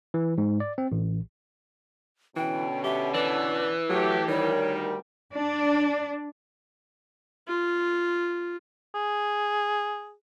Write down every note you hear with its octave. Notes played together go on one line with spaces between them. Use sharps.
E3
G#2
D5
C4
A1
B2 D3 E3 C#4 G5
G4 E5
E3 B4 D5
F#3 A3 G4
D2 D#3 G3 A#4 C#5
D4
F4
G#4